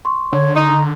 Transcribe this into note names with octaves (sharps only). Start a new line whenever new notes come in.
C6 C#6
D3 C#5
D#4 A#5